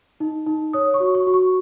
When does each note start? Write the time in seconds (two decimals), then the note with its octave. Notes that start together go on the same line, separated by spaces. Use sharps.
0.20 D#4
0.46 D#4
0.73 C#5 D#6
0.94 C#6
1.00 F#4
1.15 C#6
1.27 F#4
1.34 C#6